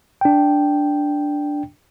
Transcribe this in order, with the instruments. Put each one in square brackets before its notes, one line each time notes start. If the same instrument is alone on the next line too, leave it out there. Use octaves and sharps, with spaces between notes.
[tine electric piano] D4 G5